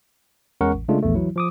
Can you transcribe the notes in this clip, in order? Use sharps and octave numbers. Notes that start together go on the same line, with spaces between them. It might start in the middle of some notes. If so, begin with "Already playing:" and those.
E2 G#3 C#4 A#4 F#5 C#6
A1
C#3 G#3 A3 D4 F4
A#1 E2 A3
E3 F#3 E4
F3 D6 D#6